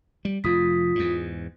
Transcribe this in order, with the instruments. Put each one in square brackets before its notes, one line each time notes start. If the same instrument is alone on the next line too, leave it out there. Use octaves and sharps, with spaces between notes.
[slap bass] G3
[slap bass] F1 F2 [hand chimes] F4 D#6 B6
[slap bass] E2 G#2